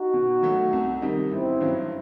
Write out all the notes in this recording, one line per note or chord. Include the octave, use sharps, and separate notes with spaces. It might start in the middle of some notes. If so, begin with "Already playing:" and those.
Already playing: D#4 F#4
B2
F#3 A3
C2
C3 D#3 G3 D#4
A1 C4 E4
G2 F#3